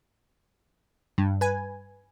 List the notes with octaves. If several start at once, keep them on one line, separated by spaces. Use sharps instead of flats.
G2
B4 G#5